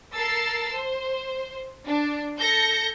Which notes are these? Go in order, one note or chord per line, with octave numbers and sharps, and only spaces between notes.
A4 A#4 E6 A6 C7
C5
D4
A4 G6 A#6 C#7